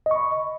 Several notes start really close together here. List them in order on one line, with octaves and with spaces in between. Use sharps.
D#5 C#6 B5